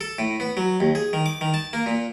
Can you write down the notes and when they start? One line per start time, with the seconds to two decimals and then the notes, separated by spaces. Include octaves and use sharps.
0.01 A4
0.19 A2
0.40 B3
0.57 F#3
0.80 D#2
0.95 G#4
1.13 D#3
1.26 D6
1.41 D#3
1.54 A5
1.73 A#3
1.86 A#2